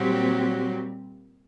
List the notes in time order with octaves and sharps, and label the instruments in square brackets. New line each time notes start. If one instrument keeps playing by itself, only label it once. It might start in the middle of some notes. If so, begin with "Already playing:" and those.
Already playing: [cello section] A#2 G3 C4 G4 [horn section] F#3